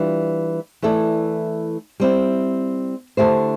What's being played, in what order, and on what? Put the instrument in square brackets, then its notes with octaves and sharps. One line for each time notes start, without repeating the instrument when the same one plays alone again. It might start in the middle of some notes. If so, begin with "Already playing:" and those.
Already playing: [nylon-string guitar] E3 G3 D4 F4
E3 A3 E4 A4 D5
G3 C4 E4
D3 A3 E4 G4 C5